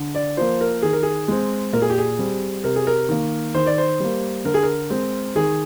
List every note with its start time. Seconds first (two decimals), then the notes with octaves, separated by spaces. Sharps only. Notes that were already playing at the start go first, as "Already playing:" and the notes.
Already playing: D3
0.15 D5
0.37 F3 A#3 C5
0.61 A#4
0.82 D#3 G#4
0.93 A#4
1.03 G#4
1.28 G#3 C4
1.73 A#2 A#4
1.82 G#4
1.90 G4
1.98 G#4
2.19 G3 C4
2.64 C3 A#4
2.76 G#4
2.87 A#4
3.09 D#3 A#3
3.54 D#3 C5
3.66 D5
3.78 C5
4.00 G3 A#3
4.45 D3 A#4
4.54 G#4
4.63 A#4
4.90 G#3 C4
5.36 D#3 G#4